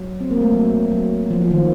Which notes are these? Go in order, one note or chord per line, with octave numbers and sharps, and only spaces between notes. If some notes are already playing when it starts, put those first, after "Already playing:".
Already playing: F#3
C4
A#3
A3
F#3
F#3
F3
F3
D#3